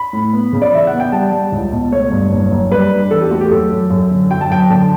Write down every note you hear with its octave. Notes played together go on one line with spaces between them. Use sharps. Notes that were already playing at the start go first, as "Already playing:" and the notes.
Already playing: B5
A2
B3
C#3
D5
E3 E5
F#5
B3
G5
G3 A5
G3
C#2
B2
A3 C#5
G2
F#1
F#1
G3 B4
D4
E2 A4
G4
A3 F#4
G4
F#2 A4
F#2
F#2
D3
F#3 G5
A5
F#2 G5
D3 A5